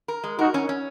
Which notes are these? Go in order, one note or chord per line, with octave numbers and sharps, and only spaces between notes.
A#4
G#3
D#4 F#4 A#4
C#4
C#4